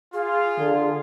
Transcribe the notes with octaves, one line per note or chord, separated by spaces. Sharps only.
F4 G#4 F5
D3